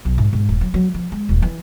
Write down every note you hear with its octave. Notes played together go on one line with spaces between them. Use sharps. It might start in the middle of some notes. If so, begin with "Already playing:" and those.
B1
G#2
G#2
D#1
F#3
F#3
F3
G#3
D#1
E3